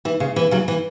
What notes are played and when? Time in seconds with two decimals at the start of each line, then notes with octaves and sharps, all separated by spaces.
0.05 E3
0.20 C#3
0.36 E3
0.51 C#3 F#3
0.68 E3